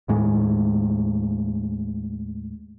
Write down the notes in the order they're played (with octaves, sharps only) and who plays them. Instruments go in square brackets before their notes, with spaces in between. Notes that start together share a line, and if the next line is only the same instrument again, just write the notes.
[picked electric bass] D#2 A2 G#3